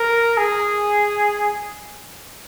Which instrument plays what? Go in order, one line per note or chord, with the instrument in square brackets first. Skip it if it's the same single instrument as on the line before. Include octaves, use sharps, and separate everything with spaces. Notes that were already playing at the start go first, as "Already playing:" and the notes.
Already playing: [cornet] A#4
G#4